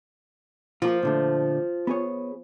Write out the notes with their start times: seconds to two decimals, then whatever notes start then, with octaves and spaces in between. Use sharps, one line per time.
0.82 F3 A#3 F4
1.03 A#2 D3 A3
1.87 B3 G#4 C#5